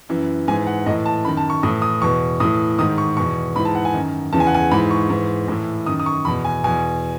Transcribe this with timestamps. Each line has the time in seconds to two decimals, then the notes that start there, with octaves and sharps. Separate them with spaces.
0.09 F#2 E3
0.48 G#2 G#5
0.51 E3
0.67 F#5
0.86 A2 E3 D#5
1.06 A5
1.25 F#2 B5
1.28 D#3
1.37 A5
1.50 C#6
1.63 A2 E3 D#6
1.82 D#6
2.02 E2 B2 C#6
2.40 A2 E3 D#6
2.78 G#2 D#3 D#6
2.98 C#6
3.17 E2 B2 C#6
3.56 G#2 E3 B5
3.65 A5
3.75 F#5
3.85 G#5
3.94 F#2 D#3
4.33 E2 C#3 E3 A5
4.40 G#5
4.47 F#5
4.55 G#5
4.71 G#2 E3 B5
4.91 C#6
5.10 G#2 E3
5.48 A2 E3
5.86 F#2 D#3 D#6
6.00 D#6
6.06 C#6
6.25 E2 B2 B5
6.45 G#5
6.64 E2 B2 G#5